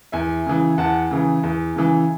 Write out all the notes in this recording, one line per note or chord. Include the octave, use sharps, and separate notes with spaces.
E2 E5 G#5
C#3 E3
E2 F#5 A5
C#3 E3
E2
C#3 E3